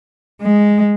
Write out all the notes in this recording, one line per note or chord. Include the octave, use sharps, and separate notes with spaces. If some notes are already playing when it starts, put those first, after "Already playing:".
G#3